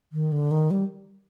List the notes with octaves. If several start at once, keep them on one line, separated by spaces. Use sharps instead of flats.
D#3
D3
D#3
G3